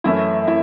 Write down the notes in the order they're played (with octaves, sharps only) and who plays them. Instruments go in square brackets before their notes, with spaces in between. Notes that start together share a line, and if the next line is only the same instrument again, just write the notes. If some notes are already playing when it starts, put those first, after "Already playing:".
[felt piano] F#2 E3 A3 C#4 E4 E5
E4 E5